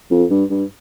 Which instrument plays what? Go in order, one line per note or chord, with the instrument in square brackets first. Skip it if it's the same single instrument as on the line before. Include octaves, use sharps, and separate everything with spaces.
[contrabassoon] F2
G2
G2